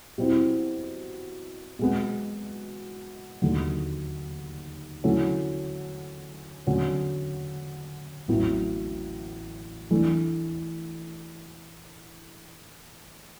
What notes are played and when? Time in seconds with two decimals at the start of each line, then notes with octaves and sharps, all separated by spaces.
0.18 B2 G3 C4 E4
1.79 B2 G#3 B3
3.42 D#2 D3 F#3 A3
5.04 D3 F#3 A3 C#4 E4
6.67 D3 F#3 A3 C#4 F#4
8.28 A1 A2 F#3 B3
9.91 E3 A3 D4